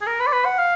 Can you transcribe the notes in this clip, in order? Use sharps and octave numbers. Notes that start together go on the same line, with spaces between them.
G#4
A#4
B4
D5
B4
F#5
F5